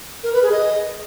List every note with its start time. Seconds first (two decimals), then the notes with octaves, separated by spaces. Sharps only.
0.24 A#4
0.33 B4
0.42 G#4
0.52 D#5